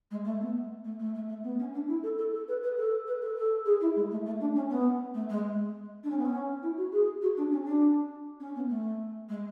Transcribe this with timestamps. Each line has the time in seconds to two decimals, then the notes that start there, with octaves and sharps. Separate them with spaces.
0.11 G#3
0.25 A3
0.41 B3
0.84 A3
0.99 A3
1.15 A3
1.29 A3
1.43 B3
1.59 C#4
1.74 D4
1.88 E4
2.03 A4
2.18 A4
2.33 A4
2.48 B4
2.63 B4
2.78 A4
3.07 B4
3.21 A4
3.37 A4
3.65 G#4
3.81 E4
3.96 G#3
4.11 A3
4.25 A3
4.40 D4
4.55 C#4
4.70 B3
5.14 A3
5.29 G#3
6.04 D4
6.10 C#4
6.18 B3
6.25 C#4
6.62 E4
6.77 F#4
6.92 G#4
7.22 F#4
7.37 D4
7.51 C#4
7.66 D4
8.40 C#4
8.55 B3
8.69 A3
9.29 G#3